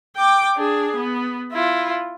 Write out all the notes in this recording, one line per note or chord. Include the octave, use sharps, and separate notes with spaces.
G5 D6
D4 G#4
B3
E4 F4